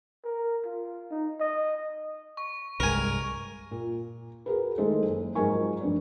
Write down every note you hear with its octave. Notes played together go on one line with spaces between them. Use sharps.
A#4
F4
D#4
D#5
C#6
C2 G2 G#3 A#4 G#5
A#2
F#4 G#4 A#4 B4
D#3 G#3 A3 E4 A4 C5
F#1
G#2 F3 F#3 A#4 G#5 C#6
F1 G2 D5